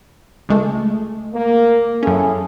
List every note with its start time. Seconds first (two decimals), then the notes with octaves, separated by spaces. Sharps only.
0.49 C#2 G#3 A3
1.34 A#3
2.03 F#2 C#4 E4 G#4 A4